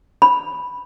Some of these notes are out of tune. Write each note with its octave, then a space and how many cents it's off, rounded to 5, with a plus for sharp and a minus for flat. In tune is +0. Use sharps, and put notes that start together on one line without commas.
B5 -5